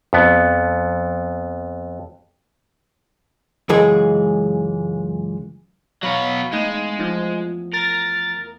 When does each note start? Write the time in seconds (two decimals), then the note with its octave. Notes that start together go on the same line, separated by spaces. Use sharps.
0.13 F2 B3
3.69 C#2 F#2 E3 G#3 G#4
6.03 E2 F#3 B3 F5 B5
6.53 G#3 A3 D#4
7.00 F3
7.74 A#4 A6